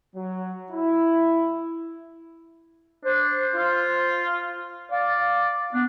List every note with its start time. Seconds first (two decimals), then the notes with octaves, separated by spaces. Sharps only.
0.15 F#3
0.71 E4
3.05 D4 C5
3.56 F4
4.92 D5 F5
5.74 B3 D4